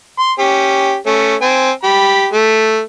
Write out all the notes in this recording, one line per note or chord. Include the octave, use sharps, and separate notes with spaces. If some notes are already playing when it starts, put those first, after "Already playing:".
C6
C#4 G4
A3 C#4
C4 G#5
G4 B5
A3